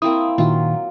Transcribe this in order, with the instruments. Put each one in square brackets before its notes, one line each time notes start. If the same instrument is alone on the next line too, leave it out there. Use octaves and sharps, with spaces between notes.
[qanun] A#3 C4 E4 [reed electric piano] D#6
[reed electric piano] A#2 D#3 [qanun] F#3 F4